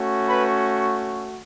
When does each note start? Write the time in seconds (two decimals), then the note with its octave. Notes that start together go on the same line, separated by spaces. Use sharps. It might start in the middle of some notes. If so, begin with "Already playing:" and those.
Already playing: A3 C#4 F#4
0.27 B4 B5